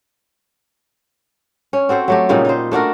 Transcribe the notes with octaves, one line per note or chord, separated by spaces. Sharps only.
C#4
C4 F#4 A4 C5
F#3 A3 G4
A#2 C#3 G3 D#4
D#4 C5
A3 D4 F#4 A#4